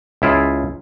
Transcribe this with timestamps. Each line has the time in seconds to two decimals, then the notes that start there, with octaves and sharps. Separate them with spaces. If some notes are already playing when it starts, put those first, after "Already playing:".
0.22 C#2 E4 F4 G#4